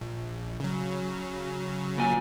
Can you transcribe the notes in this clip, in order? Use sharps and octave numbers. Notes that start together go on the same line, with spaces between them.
A#1
C#3 F#3
A#2 G#5